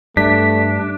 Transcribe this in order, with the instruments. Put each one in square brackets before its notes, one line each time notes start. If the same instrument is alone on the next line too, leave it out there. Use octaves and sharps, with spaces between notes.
[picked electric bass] G2 [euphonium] A3 [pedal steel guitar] D4 [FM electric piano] B6